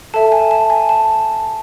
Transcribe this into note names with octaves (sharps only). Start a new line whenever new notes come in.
A4 E5 A5
G#5
A5
G#5
A5